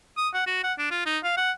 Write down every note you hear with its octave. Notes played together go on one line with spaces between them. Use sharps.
D#6
F#5
F#4
F#5
D4
F4
D#4
F5
F#5